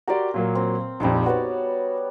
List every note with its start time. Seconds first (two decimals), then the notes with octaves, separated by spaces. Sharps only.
0.08 F#4 G4 A#4 D5 C6
0.34 A#2 F#3 A#3
0.55 C4
1.00 A#1 F2 G3 D#4 D6
1.26 B3 F#4 C#5 D5